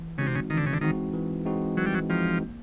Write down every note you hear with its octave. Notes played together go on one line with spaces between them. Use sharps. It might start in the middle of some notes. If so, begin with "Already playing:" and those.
Already playing: E3
C#3 G#3 C4 D#4 F#4
C3
C#3
D#3 E3
D3
C#3
D3
D#3 G#3 C4 D#4 F#4
E3
G#3 C4 D#4 F#4
E3 F#3
G3
F#3
F3 G#3 C4 D#4 F#4
A#3